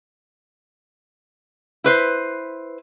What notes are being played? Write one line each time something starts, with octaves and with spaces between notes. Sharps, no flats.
E4 B4 C5